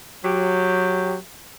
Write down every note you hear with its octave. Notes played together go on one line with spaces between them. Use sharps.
F#3 G4